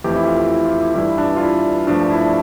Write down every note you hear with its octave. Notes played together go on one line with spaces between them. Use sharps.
F2 E3 A3 G4
E4
F4
E4
F4
E4
G2 E3 G3 E4
D4
F4
E4
G2 F3 A3 D4
E4